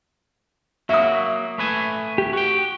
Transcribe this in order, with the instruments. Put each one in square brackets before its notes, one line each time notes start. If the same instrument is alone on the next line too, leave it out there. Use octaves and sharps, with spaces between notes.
[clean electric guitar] F#3 A#3 F#4 [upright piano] E5 D#6
[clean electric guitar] A3 B4 G#5
[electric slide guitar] G4
[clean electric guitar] F#4 G5